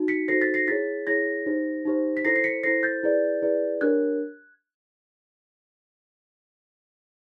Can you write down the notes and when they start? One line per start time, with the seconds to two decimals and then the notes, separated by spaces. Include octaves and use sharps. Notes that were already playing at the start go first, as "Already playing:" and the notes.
Already playing: D#4 F#4
0.08 B6 C#7
0.28 D#4 F#4 A4 C5 A#6 C7
0.41 A6 B6
0.54 A#6 C7
0.67 E4 G#4 C#5 A6 B6
1.07 E4 G#4 C#5 G#6 A#6
1.46 D#4 G4 C5
1.85 D#4 G4 C5
2.17 B6
2.25 E4 A4 C5 A#6 C7
2.36 C7
2.44 B6 C#7
2.63 E4 A4 C5 A#6 C7
2.83 G6 A6
3.03 E4 G#4 B4 D5
3.42 E4 G#4 B4 D5
3.81 D4 G4 A#4 C#5 F#6 G#6